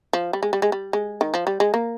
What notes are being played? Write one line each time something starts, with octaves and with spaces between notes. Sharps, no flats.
F3
G3
G#3
G3
G#3
G3
G#3
D#3
F3
G3
G#3
A#3